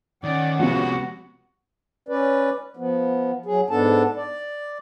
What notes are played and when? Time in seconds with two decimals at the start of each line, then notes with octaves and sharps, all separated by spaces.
0.24 D#3 C#4 D5 F#5
0.59 C3 F3 G#3 B3 F4 F#4
2.09 C#4 B4 D5
2.77 F3 B3
3.46 F#3 G#4
3.70 G#2 B3 D4 A4 A5
4.16 D5